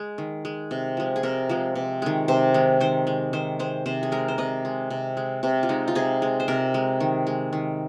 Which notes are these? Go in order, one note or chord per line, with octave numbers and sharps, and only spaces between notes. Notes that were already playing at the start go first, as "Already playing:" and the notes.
Already playing: G#3 G#4
D#3
G#3
C3
F3 G#3
G#4
C3 A#4
F3 G#3
C3
D#3 G#3
C3 C5
D#3 G#3
D#3 C5
G#3
D#3 C5
G#3 C5
C3 C5
G#4
G#3 A#4
C5
C3 D#5
G#3
C3
G#3
C3
F4
G#3 D#4
F4
C3 G#4
G#3
C5
C3 A#4
G#3
D#3
G#3
D#3